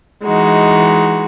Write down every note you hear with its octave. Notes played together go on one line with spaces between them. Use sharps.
E3 G#3 D#4 F#4